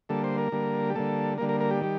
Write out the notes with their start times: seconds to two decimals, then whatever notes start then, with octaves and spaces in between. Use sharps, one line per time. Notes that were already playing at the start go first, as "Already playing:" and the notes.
0.09 D3 G3 A#3 A4
0.24 C5
0.38 A#4
0.52 D3 G3 A#3
0.90 G4
0.95 D3 G3 A#3 A4
1.38 D3 G3 A#3 A#4
1.49 A#4
1.60 A#4
1.71 G4
1.81 D#3 G3